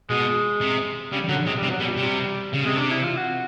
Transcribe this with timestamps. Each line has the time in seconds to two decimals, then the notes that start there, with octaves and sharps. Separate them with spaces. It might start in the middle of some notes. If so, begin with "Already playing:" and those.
0.09 B2 G#3
0.61 C3
1.12 C#3 G3
1.28 D3 F#3
1.46 C3 G#3
1.57 G3
1.63 C3
1.70 F#3
1.80 B2 G3
1.97 C3
2.53 C#3
2.65 C3 G#3
2.77 D4
2.91 E4
3.03 F4
3.17 F#4